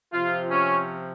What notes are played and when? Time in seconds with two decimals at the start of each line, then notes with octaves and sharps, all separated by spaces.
0.13 C3 F3 F4
0.50 C#4